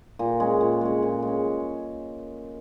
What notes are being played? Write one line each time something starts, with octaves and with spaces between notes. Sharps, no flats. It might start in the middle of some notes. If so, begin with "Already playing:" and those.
A#2
G#3 C#4
A#2
G#3 C#4
A#2
G#3 C#4